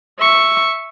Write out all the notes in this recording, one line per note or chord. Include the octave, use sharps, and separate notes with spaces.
E5 C#6